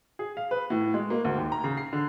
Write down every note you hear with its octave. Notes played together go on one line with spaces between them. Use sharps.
G#4
F5
B4
A2
G#3
A#3
D2
D#2
A#5
C#3
C7
D3